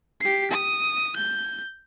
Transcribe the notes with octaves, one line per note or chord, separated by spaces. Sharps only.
G4 C7
D#6
G6